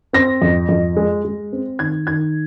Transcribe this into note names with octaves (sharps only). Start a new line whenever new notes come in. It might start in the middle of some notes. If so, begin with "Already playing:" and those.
C4 A#6
F2
F2
G#3
G#3
C4
D#3 G#6
D#3 G#6